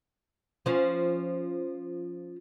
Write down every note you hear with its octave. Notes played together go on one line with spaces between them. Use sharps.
F3 C#4